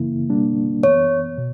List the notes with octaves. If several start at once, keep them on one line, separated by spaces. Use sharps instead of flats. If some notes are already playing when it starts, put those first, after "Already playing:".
Already playing: F#2 C#3 E3 A#3 E4
B2 G3 A#3 D4
F#2 E3 B3 C#5
B2